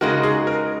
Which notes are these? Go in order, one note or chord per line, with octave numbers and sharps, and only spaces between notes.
C#3 G#3 D#4 F#4 A#4
G#4
A#4